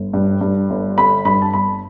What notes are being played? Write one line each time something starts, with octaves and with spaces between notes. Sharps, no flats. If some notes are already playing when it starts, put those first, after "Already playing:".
Already playing: G1
G2
G2
G1
D3 B5
G2 B5
A5
G1 B5